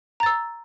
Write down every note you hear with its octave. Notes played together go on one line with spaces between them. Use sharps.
A#5 E6 A6